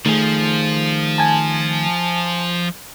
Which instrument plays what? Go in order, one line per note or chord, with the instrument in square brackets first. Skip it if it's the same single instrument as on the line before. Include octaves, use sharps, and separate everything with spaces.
[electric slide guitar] D#3 G#4 [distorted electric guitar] F3 [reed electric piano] A3
[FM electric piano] G#5 A5